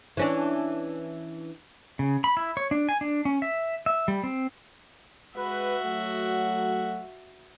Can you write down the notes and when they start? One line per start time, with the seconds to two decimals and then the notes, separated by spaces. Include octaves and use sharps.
0.17 E3 C#4 D4
1.99 C#3
2.24 B5
2.37 E4
2.57 C#5
2.71 D4
2.89 G#5
3.01 D4
3.25 C#4
3.42 E5
3.86 E5
4.08 G3
4.23 C4
5.37 G#3 F#4 B4 E5
5.84 F#3 A3 F#5